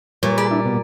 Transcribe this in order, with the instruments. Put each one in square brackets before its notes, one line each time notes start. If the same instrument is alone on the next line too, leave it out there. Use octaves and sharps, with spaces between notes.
[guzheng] A#2 [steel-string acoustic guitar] G3 [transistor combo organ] C#5
[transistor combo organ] G#4 B5 [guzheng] D5
[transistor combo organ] D4 E4
B2